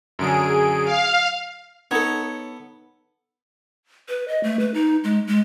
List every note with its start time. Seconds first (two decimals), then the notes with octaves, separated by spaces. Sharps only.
0.19 F#2 D3 F#3 G#4 D7
0.85 F5
1.91 B3 D#4 A4 C#5
4.08 B4
4.28 D#5
4.43 A3
4.59 B4
4.74 D#4
5.04 G#3
5.27 G#3